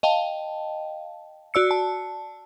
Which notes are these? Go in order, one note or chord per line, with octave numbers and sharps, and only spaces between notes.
D#5 F5 G5 A5
F#4 D5 E6 C#7
A5